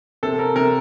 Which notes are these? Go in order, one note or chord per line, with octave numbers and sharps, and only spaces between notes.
C3 A4
A#4
C3 A#4